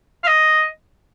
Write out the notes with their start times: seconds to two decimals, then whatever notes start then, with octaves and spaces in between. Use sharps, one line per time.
0.24 F5
0.28 D#5